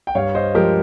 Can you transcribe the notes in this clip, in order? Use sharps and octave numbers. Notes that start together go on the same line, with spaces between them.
G5
G2 C#5 F5
C5 D#5
F3 G#3 G4 A#4